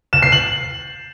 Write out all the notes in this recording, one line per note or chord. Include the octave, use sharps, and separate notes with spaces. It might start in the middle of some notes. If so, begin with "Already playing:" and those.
E7
C7
F#7